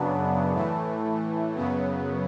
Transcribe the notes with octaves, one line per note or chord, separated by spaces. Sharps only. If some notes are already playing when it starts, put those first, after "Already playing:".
Already playing: F#2 C#3 F#3 B3 D4
A2 E3 A3
F#2 C#3 F#3 B3